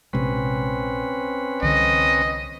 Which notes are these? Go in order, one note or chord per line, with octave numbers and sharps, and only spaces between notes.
A#1 C3 G#3 C4 C#4 B4
C2 D3 E3 D#5